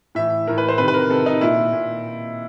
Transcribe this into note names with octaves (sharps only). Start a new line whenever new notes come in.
A2 E3 E5
A2 E3 A#4
B4
C5
C3 D#3 B4
B4
A#4
C3 D#3 A4
D#4
A#2 E4
A#2